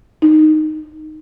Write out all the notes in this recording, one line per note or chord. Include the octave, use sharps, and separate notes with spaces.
D#4